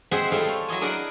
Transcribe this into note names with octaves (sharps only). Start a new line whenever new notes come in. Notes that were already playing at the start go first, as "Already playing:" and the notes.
G#3 C4 G#4 C5 E5 F#5
G3 A3 C4 E4 F4 G#4
A4 C#5
F#3 E4 D#5 G#5
D4 G#4 A#4 D5 F#5